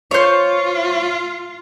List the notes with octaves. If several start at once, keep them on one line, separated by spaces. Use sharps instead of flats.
F4 C5 C#5